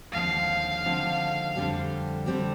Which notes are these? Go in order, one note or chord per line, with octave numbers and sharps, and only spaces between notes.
D#2 D3 F3 G#3 C4 F5
D#2 D3 F3 G#3 C4
F2 D3 G3 C4 G4
D3 G3 C4 G4